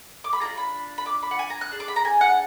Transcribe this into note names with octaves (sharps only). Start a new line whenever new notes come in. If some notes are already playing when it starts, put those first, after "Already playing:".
D6
B5
D4 F4 G#4 A#5
B5
B5
D6
B5
F#5
G#5
A#5
F#6
D4 G#4
D6
B5
A#5
G#5
F#5